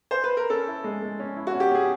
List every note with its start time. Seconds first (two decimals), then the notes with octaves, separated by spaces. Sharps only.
0.11 C5
0.24 B4
0.37 A#4
0.50 C#4 A4
0.67 E4
0.84 G#3
1.02 G#3
1.20 C#4
1.36 E4
1.47 F#4
1.54 C#4
1.60 G4
1.71 C#4 G#4